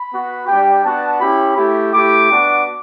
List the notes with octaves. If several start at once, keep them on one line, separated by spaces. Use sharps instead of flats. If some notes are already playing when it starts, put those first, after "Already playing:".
Already playing: B5
B3 F#4
G3 D4 G4 G5
B3 D4 F#4 A5
C#4 E4 G4 B5
A3 E4 G4
A3 E4 G4 D6
B3 D4 F#4